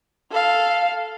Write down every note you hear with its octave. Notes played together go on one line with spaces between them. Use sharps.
A4 F5